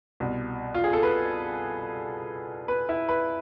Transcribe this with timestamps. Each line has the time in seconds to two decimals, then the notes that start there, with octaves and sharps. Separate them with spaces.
0.20 C2 B2
0.74 F4
0.84 G#4
0.93 A4
1.03 B4
2.68 B4
2.89 E4
3.09 B4